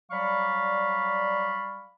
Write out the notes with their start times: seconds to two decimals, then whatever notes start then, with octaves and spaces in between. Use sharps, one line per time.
0.11 F#3 G3 D5 F5 B5 C#6